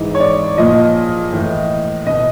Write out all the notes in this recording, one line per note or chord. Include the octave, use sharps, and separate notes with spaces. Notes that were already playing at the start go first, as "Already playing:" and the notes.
Already playing: G#2 E3 D#5
C#5
D5
A#2 F3 D#5
A2 E3
B2 D#5